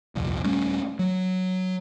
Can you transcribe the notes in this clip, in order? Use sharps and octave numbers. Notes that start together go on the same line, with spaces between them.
D#1 C2 F2
D#1 G3 A3 C#4
F#3